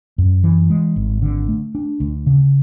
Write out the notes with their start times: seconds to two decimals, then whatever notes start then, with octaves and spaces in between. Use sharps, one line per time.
0.18 F#2
0.44 E3
0.70 G#3
0.96 G#1
1.22 D3
1.49 A3
1.75 D4
2.00 D2
2.26 C#3